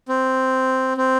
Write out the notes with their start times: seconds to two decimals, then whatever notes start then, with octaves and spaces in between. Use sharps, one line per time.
0.09 C4
0.97 C4